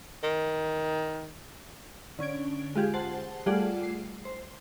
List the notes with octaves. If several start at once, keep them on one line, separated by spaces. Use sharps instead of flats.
D#3
D3 C#4 G#6 D7
G#3 F4 G4 G#4
C5 F#5 A5 C7
G3 A3 F4 G#4 D5 F#5
C7
C5